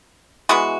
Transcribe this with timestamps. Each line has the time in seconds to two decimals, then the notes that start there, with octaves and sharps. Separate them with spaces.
0.49 E3 G#3 B3 F#4